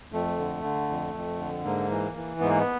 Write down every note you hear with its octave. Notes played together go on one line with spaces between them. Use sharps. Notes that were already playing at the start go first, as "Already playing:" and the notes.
F2 A3
D3
D3
F2
F2
D3
G#2 A#3
E3
E3
G#2 B3
A#3
B3